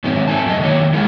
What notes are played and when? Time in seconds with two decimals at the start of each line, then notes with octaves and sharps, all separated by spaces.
0.04 G#2 D#3 E3 F#3 C4 C#4
0.28 A3 C4 A4 G#5 A5
0.46 F#2 A3 D#5
0.60 D#3 F#3 A#3 C#5
0.93 G#3 E4 A#4